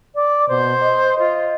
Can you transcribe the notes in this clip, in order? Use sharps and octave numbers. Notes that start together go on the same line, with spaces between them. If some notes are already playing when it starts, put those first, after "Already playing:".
D5
B2 C5
D#5
F4